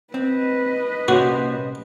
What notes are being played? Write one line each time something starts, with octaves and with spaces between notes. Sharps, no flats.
C4 B4 D#5
C2 A#2 A#3 C#4 F#4 C5